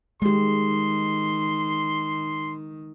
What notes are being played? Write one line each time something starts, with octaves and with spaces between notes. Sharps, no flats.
D#3 G#3 G4 C6